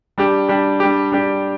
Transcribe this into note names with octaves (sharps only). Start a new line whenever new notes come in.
G3 D4 G4
G3 D4 G4
G3 D4 G4
G3 D4 G4